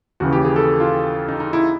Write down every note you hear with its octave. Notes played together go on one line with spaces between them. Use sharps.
D#2 C#3 E3 F#4
G4
G#4
A4
F4
D#4
D#4
E4